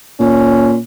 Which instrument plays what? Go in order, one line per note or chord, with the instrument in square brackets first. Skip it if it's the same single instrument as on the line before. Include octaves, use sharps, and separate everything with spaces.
[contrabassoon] A#2 [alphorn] C#4